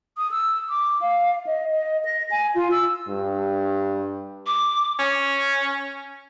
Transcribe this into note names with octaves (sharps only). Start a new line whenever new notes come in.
D#6
E6
D6
F5
D#5
D#5
A#6
G#5
F4
E6
G2
D6
C#4